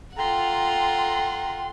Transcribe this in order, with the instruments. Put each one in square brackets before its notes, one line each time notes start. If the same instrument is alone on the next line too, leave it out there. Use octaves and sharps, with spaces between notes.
[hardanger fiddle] F4 F#5 [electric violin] A4 C6 [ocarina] G5 [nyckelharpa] A#5